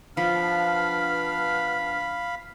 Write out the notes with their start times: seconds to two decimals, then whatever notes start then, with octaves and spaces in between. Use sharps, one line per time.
0.17 F3 B3 D4 F5 B5 F6